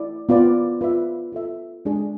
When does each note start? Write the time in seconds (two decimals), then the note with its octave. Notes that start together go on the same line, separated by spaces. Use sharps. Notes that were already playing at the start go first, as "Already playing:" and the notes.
Already playing: E4 D5
0.29 B3 F4 B4 D5
0.81 F4 B4 E5
1.32 F4 A4 E5
1.85 G#3 D4 G#4